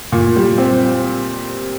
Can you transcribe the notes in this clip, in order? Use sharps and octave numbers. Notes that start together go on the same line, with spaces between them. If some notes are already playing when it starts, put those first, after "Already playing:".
A#2
G3
C4